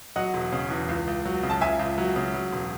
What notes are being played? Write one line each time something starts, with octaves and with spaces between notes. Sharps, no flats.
F#3 D#5 F#5
E1
C#3
E2
C#2
C#2
F#3
C#3
A5
C#2 E5 G#5
C#2
F#3
C#3
F#3
E1